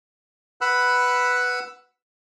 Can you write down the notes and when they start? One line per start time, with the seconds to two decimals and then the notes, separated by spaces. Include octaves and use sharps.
0.61 B4 F#5 B5 E6 F#6